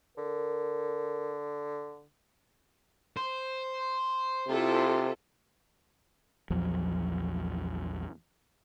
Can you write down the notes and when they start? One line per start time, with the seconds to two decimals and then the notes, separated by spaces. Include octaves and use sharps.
0.18 D3 A#4
3.17 C5
4.48 C3 E4 F4 A4
6.50 A#1 E2 F3 F#3